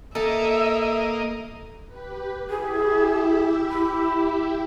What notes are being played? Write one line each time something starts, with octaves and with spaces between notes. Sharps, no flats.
A#3 A4 D#5 E5
G4 B4
E4 G4 G#4 E5
B5